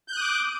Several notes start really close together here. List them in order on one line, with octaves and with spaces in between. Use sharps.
G6 F#6 D#6 D6